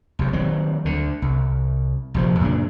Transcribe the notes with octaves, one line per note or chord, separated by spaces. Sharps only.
B1 C3
D#3 F#3 G3 C4
D2 D3
C2
A#1 C3 F3
F#2 A#2 C#3 D4